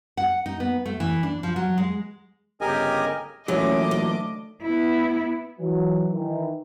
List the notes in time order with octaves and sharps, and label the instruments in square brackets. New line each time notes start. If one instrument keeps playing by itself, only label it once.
[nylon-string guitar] F#5
D#4
B3
A3
E3
D4
F3
F#3
G#3
[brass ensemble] G1 C#3 G4 [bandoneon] A#4 D#5 G#5
[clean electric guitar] A#2 E3 F#3 [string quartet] A3 D#5 D6 [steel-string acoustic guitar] C#4
[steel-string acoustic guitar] D2
[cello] B3 E4
[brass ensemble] E3 F#3
D#3 E3